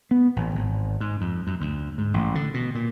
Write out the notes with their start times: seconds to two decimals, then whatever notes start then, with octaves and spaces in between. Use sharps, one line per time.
0.11 B3
0.36 A1
0.55 G#1
1.01 G#2
1.21 F2
1.47 F#2
1.61 D2
1.98 G#2
2.14 A1
2.35 D3
2.54 B2
2.75 A#2